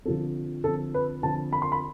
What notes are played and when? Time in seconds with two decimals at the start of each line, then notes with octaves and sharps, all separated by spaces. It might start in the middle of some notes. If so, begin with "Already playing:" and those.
0.05 D3 F3 C4 A4
0.64 D3 F3 C4 A4
0.94 B4
1.23 D3 F3 C4 A5
1.53 B5
1.62 C6
1.72 B5